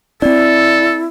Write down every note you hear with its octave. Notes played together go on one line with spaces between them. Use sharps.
C4 D4 E4 A4 D5